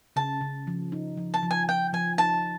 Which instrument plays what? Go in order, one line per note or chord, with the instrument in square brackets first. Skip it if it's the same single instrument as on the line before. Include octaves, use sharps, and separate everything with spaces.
[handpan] C#3 [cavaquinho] A5
[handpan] C#3
F3
D#4
F3
[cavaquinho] A5
[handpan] F3
[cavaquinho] G#5
[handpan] F3 [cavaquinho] G5
[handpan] F3 [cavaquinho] G#5
[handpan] D#4 [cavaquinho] A5